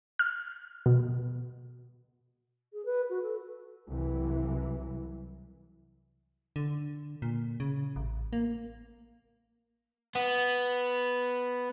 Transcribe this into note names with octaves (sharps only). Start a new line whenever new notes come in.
F6
B2
G#4
B4
F#4
A4
C2 E3 F#3
D3
A#2
C#3
A1
A#3
B3